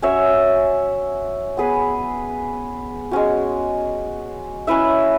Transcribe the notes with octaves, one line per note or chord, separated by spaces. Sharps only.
C#4 F#4 C#5 E5
B3 G#4 B4
G#3 C#4 F#4
C#4 E4 B4 E5